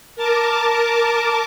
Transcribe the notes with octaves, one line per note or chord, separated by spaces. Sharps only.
A#4 A5 D6